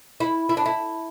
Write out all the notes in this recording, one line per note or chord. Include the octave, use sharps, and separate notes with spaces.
E4
E4
D4
E4